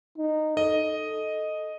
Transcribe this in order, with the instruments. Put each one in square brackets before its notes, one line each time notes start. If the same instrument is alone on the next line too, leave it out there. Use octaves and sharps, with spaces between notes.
[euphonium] D#4
[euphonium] A4 [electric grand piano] D#5